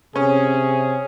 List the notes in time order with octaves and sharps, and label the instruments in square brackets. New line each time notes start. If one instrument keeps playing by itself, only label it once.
[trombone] C3 [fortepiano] C#4 [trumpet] G#4